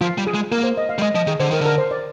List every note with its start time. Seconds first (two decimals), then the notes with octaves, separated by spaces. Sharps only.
0.01 F3 F4
0.18 G3
0.27 G#4
0.35 G#3
0.52 A#3 A#4
0.64 C5
0.77 D#5
0.89 F5
0.98 G3
1.02 G#3 D#5
1.15 F3 D#5
1.27 D#3 G#4
1.40 D3 C5
1.51 D#3 A#4
1.61 D3 A#4
1.78 C5
1.91 D5